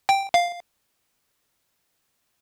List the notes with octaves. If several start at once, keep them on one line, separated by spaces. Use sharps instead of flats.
G5
F5